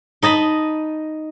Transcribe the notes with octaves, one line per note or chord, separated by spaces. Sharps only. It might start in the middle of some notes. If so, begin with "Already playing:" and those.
D#4 D#5 A5 B5